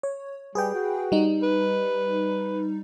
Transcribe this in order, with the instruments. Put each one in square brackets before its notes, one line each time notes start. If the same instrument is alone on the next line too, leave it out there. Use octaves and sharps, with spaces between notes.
[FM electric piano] C#5
[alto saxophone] G3 [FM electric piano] G#4 B4 G5
[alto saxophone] F#4
[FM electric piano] G3 D#4
[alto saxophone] B4